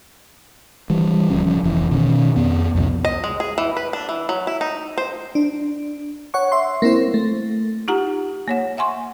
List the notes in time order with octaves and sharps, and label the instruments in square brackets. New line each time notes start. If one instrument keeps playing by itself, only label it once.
[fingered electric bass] E3 G3
D1 C#2 F3 C#4
F1 E3
B2 D#3 C#4
F2 B3
C2 F2 A#2 C#3
[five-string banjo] D#5
G#3
G#4
E3
B4
D4
E3
F#3
E4
D#4
C5
[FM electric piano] D4
C#5 F#5 C#6
E5 C6
A#3 C4 E4 C5
A3
[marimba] D#4 F4 G4 F#5 A#5
A#3 C#5 F#5
E5 F#5 G#5 C6 C#6